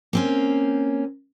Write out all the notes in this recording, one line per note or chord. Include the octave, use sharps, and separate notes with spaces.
A#3 C4 C#4